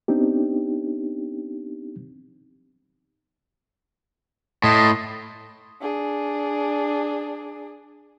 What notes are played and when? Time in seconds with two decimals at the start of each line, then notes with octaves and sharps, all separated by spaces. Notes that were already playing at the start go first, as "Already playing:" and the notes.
0.08 B3 C4 D4 D#4 G4
4.64 A2 D#5 A5 C6
5.81 D4 G#4